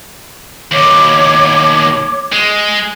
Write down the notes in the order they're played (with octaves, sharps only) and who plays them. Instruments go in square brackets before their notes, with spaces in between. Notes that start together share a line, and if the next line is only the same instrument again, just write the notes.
[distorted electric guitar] D#2 B2 [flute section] C#5 D6
[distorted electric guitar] G#3